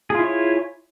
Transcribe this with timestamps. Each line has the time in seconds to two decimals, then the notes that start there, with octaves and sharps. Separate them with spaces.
0.10 G#4
0.15 F4
0.19 E4
0.24 C#5